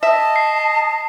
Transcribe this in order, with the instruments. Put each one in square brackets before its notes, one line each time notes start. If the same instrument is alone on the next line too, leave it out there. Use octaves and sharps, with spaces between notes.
[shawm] D#5 [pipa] E5 [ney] A5
[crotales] C7